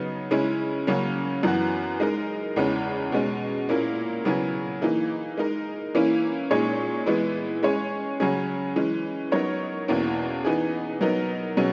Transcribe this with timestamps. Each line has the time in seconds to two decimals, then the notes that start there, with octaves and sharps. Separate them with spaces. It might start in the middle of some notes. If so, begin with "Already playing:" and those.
Already playing: C#3 F#3 B3 D#4
0.31 C#3 G#3 C#4 E4
0.87 C#3 F#3 A#3 C#4
1.43 F#2 E3 B3 F#4
2.00 G#3 D#4 A#4
2.56 E2 C#3 E3 G#3 C#4
3.12 B2 G#3 C#4
3.69 A#2 A#3 C#4 E4 A#4
4.25 C#3 F#3 B3 E4 G#4
4.82 E3 A#3 D#4 G#4
5.38 G#3 D#4 A#4
5.95 E3 A#3 C#4 E4
6.51 A#2 G#3 D#4 G#4 C#5
7.06 E3 G#3 B3 E4
7.63 G#3 C#4 G#4 C#5
8.20 C#3 F#3 C#4 G#4
8.76 E3 G#3 C#4
9.32 F#3 B3 D#4 A#4 C#5
9.88 E2 B2 A#3 C#4 E4
10.45 E3 B3 D#4 G#4
11.01 F#3 B3 D#4 A#4
11.57 B2 F#3 C#4 G#4